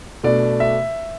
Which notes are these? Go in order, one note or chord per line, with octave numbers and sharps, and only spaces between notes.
B2 A3 D4 D5
E5